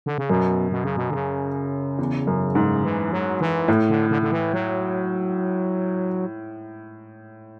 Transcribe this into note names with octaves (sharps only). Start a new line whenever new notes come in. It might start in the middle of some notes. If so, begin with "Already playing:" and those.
D3
C#3
F#2 B2
B2
C#3
B2
D3
C#3
E2
F#2
G#2
E3
F#3
E3
A2
D3
D3
D3
E3
F#3